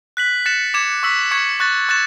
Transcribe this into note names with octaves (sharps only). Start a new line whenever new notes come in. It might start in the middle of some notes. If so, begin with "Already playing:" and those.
F#6 B6 F#7
F#6 A6 C#7 E7
D6 G#6 C#7 E7
C#6 E6 B6 F#7
C#6 G#6 C#7
C#6 F#6 A6
C#6 F#6 A6 E7